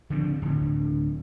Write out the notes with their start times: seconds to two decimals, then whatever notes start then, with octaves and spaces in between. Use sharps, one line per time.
0.10 D3 F3 G3 C4
0.42 D1 D3